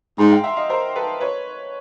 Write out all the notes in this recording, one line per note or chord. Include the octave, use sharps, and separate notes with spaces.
G#2 A#5 C6
F5 G5
E5 F#5
D#5 F5
A#4 C5
A4 B4
B4 C#5